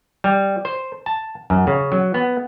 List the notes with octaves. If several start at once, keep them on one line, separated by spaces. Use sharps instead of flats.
G3
C5
A5
F#2
C#3
F#3
B3